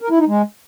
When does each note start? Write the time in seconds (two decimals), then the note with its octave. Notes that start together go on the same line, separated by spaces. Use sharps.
0.01 A#4
0.10 E4
0.19 D#4
0.28 G#3